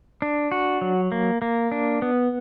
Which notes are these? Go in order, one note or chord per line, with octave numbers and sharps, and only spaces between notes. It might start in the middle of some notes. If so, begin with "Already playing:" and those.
D4
F#4
F#3
A#3
A#3
D4
B3